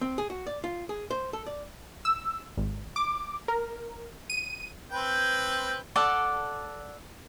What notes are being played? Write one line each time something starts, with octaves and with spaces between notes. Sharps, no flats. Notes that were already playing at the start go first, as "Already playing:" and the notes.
C4
G#4
F#4
D5
F4
G#4
C5
A4
D5
E6
G#1
D6
A#4
D#7
C4 B4 G5
A4 D5 F#5